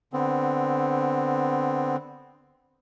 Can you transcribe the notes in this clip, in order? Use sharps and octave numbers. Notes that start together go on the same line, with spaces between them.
D3 B3 C4